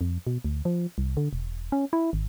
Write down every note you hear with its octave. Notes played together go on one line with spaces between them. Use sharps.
F2
B2
D2
F3
C2
D3
E1
C#4
E4
G#1